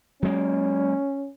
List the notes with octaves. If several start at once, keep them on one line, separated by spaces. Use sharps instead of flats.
F#3 G#3 A#3 C#4